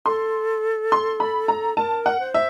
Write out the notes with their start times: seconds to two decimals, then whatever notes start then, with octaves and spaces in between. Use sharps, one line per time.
0.06 A4 C6
0.92 C6
1.20 B5
1.48 A#5
1.77 A#4 A5
2.06 F#5
2.20 C5
2.34 E5